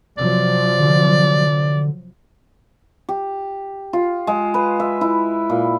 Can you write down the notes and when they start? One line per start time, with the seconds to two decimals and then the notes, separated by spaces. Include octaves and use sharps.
0.18 C3 F3 F#3 D5
0.80 D3
3.09 G4
3.93 F4
4.27 G#3
4.54 B4
4.80 E5
5.01 E4
5.50 A#2